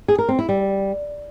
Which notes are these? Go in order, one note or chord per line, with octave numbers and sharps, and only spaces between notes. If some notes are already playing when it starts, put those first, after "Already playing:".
G#4
A#4
C4
E4
G3